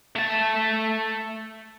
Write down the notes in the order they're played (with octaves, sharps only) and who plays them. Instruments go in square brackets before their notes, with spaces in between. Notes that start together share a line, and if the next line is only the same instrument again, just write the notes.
[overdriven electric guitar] A3 A5